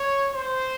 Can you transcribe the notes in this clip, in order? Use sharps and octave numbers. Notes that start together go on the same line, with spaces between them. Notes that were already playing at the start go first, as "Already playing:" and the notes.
Already playing: C#5
C5